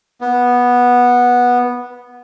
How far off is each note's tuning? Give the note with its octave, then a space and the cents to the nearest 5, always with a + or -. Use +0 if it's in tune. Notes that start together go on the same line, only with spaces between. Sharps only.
B3 -10